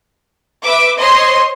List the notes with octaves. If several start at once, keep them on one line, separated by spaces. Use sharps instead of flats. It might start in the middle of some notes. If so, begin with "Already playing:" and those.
B4 E5 D6
C5 C#5 D#5 C6